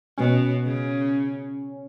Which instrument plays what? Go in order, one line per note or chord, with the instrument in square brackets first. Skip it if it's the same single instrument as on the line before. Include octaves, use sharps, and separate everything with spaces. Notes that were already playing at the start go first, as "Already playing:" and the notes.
[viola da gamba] B2 [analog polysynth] C#4
[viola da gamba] C#3